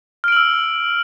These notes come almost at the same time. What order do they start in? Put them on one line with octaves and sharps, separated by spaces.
F6 D7 F#7 E6